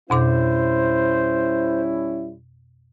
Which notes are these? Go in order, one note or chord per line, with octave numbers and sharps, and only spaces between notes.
F2 B2 G3 C#4 E4 C5 D6